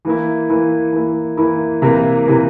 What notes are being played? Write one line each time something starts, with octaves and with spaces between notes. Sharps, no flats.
E3 A#3 E4
E3 A#3 E4
E3 A#3 E4
E3 A#3 E4
C3 E3 A#3
C3 E3 A#3